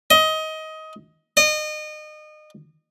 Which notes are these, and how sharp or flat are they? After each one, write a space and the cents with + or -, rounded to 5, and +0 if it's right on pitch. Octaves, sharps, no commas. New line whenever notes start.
D#5 +20
D#5 -30